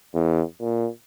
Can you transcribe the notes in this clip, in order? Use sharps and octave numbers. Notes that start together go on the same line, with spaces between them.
E2
A#2